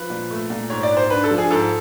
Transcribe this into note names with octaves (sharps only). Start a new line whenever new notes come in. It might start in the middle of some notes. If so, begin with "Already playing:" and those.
Already playing: F3 B4
A#2
A3
A#2
G#2 C#5
D5
G#2
C5
D4 B4
A4
F3
G#4
G#2 A4